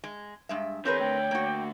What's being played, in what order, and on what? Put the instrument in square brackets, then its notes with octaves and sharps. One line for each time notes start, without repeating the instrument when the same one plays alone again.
[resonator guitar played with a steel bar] G#3
G2 G#3 E5
[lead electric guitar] E3 G#4 [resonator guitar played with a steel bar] C4 A#4 B4 [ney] C#5 [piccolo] G6
[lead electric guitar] D3 A3 [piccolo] G5
[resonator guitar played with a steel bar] A#3 F#4